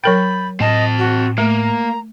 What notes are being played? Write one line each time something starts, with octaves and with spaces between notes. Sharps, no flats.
F#3 A#4 G5 B5 G6 A6
A2 C4 D#5 A5
F#4
A3 A#3 A#5